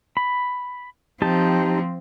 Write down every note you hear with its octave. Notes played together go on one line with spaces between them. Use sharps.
B5
F3 C4 D#4 G4 A5